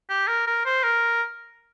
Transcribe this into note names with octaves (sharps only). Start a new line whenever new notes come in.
G4
A#4
A#4
C5
A#4